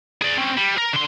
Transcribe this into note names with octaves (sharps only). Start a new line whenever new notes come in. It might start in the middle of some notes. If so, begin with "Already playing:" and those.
G#4 D5
C4 C#4
G3
A#4
D3 C6